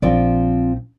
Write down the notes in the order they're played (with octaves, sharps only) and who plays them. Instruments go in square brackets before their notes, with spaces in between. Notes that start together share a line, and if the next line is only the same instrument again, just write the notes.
[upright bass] A#1 [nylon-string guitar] F3 C4 D5